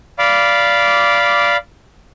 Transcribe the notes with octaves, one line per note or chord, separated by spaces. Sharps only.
D5 F5 B5 D6